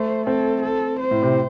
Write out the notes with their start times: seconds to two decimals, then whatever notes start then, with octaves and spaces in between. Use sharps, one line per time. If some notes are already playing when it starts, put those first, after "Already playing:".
Already playing: A3 C5
0.27 C4 A4
0.62 A4
1.00 C5
1.11 A2
1.23 C3